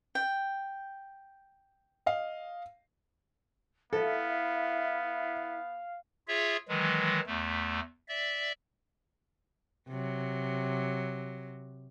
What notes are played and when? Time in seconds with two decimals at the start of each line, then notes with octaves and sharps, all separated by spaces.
0.15 G5
2.06 D#5 F5
3.93 B3 E4 A4 E5 F5
6.28 F4 G#4 C#5 E5
6.69 D#3 E3 F#3 G#3
7.26 E2 A3
8.08 D5 E5
9.89 C3 F#3